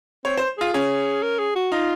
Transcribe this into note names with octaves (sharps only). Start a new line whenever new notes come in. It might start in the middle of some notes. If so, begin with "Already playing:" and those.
C4 C#5
C5
F4 G#4
C#4 G#4
A#4
G#4
F#4
D#4 F4